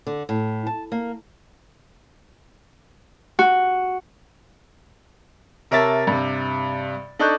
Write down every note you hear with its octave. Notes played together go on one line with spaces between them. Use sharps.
D3
A2
A5
A#3
F#4
C3 A#4 C#5 E5 A5 A6
G2 C3
D4 D#4 A4 C#6 F#6 G6